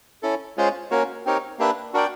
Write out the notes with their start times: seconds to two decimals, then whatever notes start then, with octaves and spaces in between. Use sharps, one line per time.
0.23 C#4 E4 A4
0.57 G#3 C#4 F4 G#4 C5
0.91 A#3 C#4 F#4 A#4 C#5
1.26 C4 D#4 G4 A#4 C#5
1.59 A#3 D4 G4 B4 E5
1.94 D4 F#4 A#4 D5 G5